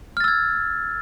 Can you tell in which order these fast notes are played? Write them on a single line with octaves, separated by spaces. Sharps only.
F6 A6 E6 G#6